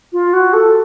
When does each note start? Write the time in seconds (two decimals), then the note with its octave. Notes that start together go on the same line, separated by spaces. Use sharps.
0.13 F4
0.33 F#4
0.53 A4